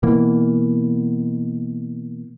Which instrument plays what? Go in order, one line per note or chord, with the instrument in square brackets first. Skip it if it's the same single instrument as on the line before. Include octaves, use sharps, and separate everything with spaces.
[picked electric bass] B2 E3 A#3